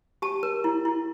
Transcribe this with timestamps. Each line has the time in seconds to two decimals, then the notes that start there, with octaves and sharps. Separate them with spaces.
0.22 G4 A5
0.43 A#4
0.64 E4
0.85 E4